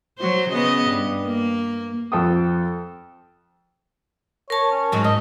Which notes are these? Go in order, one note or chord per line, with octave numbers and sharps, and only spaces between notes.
F#3 C5
C#3 B3 D#5
G2
A#3
F2 A4 G5 D#6
A#4 C#5 A5
C#4
G#2 F#3 G#3
G#2 D#5